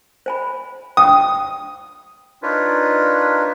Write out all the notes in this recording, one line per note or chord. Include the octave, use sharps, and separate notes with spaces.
C5 G#5 B5
G5 D#6
D4 D#4 F4 A#4 B4 C#5